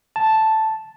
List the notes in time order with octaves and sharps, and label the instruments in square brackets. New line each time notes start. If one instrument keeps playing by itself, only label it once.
[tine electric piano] A5